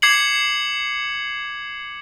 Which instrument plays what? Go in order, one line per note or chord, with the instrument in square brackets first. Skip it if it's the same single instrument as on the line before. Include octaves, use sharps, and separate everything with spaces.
[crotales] D6 G#6 C7 C#7 F#7